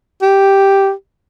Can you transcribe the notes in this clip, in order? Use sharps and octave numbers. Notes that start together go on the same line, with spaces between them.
G4